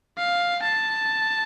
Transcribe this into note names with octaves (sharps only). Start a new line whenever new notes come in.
F5
A5